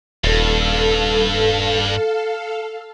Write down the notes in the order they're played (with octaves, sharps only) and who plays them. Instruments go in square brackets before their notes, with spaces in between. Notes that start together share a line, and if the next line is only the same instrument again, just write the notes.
[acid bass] D#1 [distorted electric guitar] G2 [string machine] A4 F5